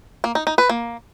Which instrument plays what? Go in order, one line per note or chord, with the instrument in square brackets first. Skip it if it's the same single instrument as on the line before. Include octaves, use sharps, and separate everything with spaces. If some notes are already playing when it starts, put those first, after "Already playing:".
[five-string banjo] A#3
D#4
D#4
B4
A#3